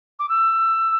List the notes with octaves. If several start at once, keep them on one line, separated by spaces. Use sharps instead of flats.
D6
E6